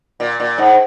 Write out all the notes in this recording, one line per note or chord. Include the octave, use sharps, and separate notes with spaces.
A#2
A#2
G#2